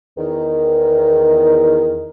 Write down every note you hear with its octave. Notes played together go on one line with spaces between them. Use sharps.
E2 D#3